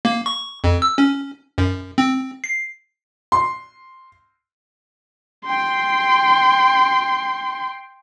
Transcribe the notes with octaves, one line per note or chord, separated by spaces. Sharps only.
A#3
C#6
F2
E6
C#4
F#2
C4
C7
C6
G5 C6